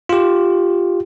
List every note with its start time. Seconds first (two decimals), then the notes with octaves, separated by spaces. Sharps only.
0.09 F4 G4